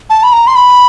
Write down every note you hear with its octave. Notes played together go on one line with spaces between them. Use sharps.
A5
B5
A#5
C6
B5